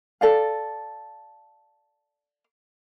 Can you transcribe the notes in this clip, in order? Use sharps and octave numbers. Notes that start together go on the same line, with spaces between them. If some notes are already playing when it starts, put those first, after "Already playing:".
A4 D5 F5